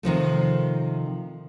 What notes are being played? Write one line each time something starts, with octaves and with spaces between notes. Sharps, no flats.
C3 D#3 F3 A3